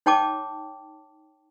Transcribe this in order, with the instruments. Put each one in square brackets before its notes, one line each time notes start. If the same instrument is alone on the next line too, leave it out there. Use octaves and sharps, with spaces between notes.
[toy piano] D#4 C#5 G5 A5 D6